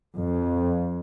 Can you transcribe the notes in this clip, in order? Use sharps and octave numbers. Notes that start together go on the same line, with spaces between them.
F2